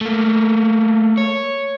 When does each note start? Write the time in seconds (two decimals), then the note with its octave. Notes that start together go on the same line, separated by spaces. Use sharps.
0.01 A3 A#3
1.17 C#5